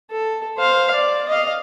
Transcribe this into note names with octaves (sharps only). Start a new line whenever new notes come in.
A4
C5 F5
D5
D#5 F5